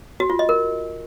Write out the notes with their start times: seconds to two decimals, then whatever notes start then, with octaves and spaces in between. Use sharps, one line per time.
0.20 F#4
0.30 F4
0.39 D#5
0.49 A#4